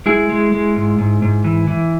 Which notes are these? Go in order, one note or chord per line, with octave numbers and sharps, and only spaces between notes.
G#3 E4 G#4
G#3
G#3
G#2
G#2
G#2
E3
E3